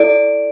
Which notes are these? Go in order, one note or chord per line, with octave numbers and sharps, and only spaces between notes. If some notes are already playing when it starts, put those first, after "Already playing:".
Already playing: E4 A4 D5 D7